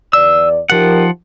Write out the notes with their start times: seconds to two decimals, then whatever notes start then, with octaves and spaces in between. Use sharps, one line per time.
0.13 E2 D5 E6
0.70 F3 D#4 G4 A#4 F#5